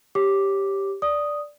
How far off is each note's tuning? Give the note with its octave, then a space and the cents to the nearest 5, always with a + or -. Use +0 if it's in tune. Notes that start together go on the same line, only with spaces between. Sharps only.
G4 +0 C#5 -10 D6 +0
D5 +0 D#6 +0